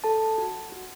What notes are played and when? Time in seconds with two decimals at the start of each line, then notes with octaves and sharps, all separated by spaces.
0.04 A4 A5
0.38 F#4
0.72 F#4